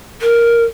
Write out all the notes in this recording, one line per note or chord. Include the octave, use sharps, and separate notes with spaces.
A#4